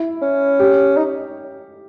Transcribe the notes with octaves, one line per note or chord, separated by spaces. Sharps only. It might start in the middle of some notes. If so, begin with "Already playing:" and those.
Already playing: E4
C#4
G4
D#4